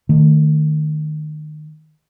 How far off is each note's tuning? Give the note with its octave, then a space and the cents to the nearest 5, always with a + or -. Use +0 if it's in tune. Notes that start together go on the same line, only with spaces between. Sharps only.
D#3 -30 A3 +5